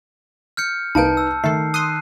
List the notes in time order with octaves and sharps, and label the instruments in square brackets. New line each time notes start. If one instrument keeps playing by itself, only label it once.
[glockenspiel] F6 G6 C#7
[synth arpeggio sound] C2 A#3 D7 [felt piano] D#4 B4 [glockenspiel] A5 G6
[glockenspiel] E6
[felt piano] D#3 [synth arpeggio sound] A3 A4 [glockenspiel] C7
[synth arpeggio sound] C6 D#6 [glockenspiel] F#6 C7 D#7